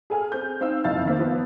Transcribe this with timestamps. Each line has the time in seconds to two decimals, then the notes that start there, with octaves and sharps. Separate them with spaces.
0.10 G#4 A4 G#5 F6
0.32 C4 G6
0.61 C4 D#4 F5 E6
0.84 F#1 F2 E4 F5 A6
1.05 D#3 A#3 C4
1.19 F3 B3